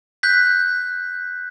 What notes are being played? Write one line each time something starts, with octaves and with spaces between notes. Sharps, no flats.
F#6 G6 B6